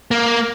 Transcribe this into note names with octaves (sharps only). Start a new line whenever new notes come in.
A#3